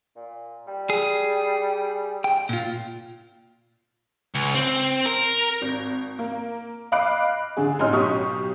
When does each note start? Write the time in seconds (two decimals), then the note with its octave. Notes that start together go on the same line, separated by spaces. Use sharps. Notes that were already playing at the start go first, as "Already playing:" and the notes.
0.16 A#2
0.67 G3
0.90 G#4
2.24 G5
2.49 A#2 F4
4.35 C#2
4.54 C4
5.06 A#4
5.62 G#1
6.19 A#3
6.92 D#5 F5 B5 D6 F#6 D7
7.57 D3 G#4
7.79 A1 C#4 D#4 D#5 C6 F6
7.93 B1 G4 C#6 D#6